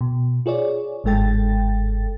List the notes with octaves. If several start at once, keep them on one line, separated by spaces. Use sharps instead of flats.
B2
F4 G#4 C#5 D5
G1 G#2 G#3 A4 G5 A6